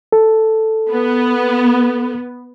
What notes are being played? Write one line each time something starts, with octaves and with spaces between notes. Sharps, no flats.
A4
B3